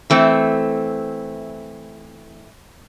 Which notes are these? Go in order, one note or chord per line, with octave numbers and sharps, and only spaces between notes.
E3 A3 C4